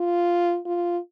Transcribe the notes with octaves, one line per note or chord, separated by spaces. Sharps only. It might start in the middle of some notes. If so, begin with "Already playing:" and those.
Already playing: F4
F4